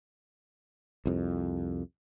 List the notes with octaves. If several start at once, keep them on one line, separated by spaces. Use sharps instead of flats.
C2 F2